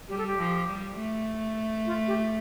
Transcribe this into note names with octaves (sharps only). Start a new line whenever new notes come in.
G3 G4
A4
G4
F3
G3
A3
F4
G4